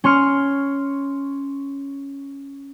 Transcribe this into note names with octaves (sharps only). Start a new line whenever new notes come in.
C#4 C6 F6 C#7